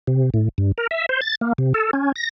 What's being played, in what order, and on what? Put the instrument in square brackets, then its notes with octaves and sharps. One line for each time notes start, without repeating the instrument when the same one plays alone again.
[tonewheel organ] C3
A2
G2
A#4
E5
C5
A6
A#3
C3
A4
C#4
A#6